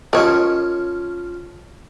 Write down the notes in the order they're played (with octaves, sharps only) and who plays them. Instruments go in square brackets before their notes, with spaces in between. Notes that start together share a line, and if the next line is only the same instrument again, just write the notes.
[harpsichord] F3 C#4 [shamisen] A#4 C#5 D#5